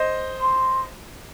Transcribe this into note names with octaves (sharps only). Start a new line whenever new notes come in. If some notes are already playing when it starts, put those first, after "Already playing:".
Already playing: C5 D#5
C6